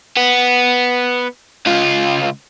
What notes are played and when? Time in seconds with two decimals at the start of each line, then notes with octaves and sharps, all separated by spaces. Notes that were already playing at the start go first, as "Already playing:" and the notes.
0.17 B3
1.66 C#2 F4